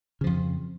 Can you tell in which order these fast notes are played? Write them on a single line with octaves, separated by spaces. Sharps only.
C#3 F3 F2